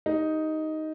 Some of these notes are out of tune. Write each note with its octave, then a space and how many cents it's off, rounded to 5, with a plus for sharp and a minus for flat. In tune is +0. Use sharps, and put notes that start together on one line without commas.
D#4 +5 G4 +0